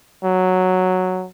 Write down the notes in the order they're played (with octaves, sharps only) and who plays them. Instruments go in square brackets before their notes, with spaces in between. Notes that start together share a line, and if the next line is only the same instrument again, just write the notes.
[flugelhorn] F#3